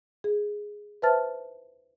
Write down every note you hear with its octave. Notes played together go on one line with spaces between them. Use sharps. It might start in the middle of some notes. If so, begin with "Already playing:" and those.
G#4
B4 C5 E5 A5 F6 A6